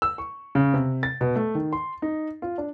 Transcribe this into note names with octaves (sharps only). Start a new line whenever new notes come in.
E6
C#6
C#3
C3
A6
B2
A3
D#3
C6
D#4
F4
D4